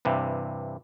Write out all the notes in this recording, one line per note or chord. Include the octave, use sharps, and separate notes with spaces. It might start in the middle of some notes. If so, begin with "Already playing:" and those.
G2 C3 E3